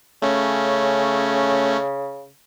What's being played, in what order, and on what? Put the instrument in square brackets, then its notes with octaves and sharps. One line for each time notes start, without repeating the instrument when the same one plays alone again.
[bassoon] C#3 [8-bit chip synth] A3 C#4